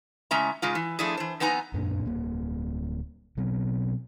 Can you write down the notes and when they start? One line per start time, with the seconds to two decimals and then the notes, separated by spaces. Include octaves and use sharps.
0.31 A2 C#3 G#3 C#4 E5 A#5
0.62 G#2 C#3 G#3 F4
0.75 E3
0.99 F3 A3 D4 E4 G#4
1.17 E3 C5
1.40 F2 B3 D#4 G#5 A#5
1.74 F#2 A#2 A#3 D4
2.05 D1 A#3
3.37 B2 F#3 B3 C4